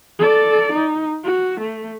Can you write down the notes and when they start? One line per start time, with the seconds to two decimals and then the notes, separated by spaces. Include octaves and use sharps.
0.19 A4 D5
0.73 D#4
1.24 F#4
1.61 A3